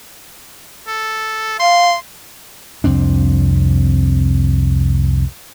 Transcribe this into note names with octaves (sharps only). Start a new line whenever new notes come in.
A4
F5 C6
C2 F2 C4 D4